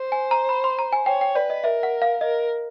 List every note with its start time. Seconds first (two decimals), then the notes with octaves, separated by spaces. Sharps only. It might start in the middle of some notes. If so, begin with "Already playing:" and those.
Already playing: C5
0.12 G#5
0.31 A#5
0.49 B5
0.64 C6
0.79 A#5
0.93 G#5
1.06 C#5 G5
1.21 G5
1.35 B4 D5
1.50 D#5
1.64 A#4 E5
1.83 F#5
2.02 F5
2.21 A#4 D#5